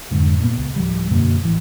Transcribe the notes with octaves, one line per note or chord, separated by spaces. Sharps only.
F2 G#2 D3
A#2 A3 B3
C#2
D1 F3 G3
F#2 B2 D3 A#3
A1 E3